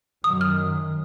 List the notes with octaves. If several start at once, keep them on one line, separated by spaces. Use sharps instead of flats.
F#2 D#3 F#3 D#6
F6